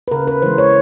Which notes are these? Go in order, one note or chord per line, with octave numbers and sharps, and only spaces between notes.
B4
C#3 A#4
B4
E3 G#3 C5
C#5